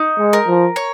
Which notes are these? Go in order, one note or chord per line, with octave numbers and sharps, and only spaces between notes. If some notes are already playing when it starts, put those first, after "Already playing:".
Already playing: D#4
G#3
A#4
F3
C#5